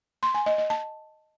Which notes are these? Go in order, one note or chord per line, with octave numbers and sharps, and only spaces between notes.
C6
G#5
D#5
D#5
A5